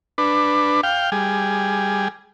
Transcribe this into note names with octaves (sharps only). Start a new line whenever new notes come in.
D4 B4
F5 G5
G3 G#4